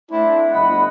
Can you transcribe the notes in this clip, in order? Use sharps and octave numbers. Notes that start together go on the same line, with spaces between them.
A3 C4 D4 E4
G1 D#5 F#5 B5